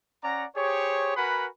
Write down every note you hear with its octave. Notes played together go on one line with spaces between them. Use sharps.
C#4 D5 F#5 A#5
G4 G#4 C5 C#5
F#4 A#4 B4 F#5 G#5 B5